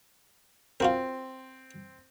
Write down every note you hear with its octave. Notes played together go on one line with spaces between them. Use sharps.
C4 F4 F#4 A#4